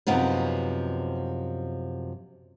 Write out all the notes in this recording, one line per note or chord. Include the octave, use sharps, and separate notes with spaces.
F#2 C3 F3 B3 D#4